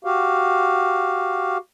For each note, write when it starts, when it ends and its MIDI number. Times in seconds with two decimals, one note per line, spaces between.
0.04 1.57 66
0.04 1.57 67
0.04 1.57 77